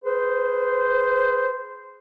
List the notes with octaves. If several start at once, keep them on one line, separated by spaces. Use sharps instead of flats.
G#4 B4 C5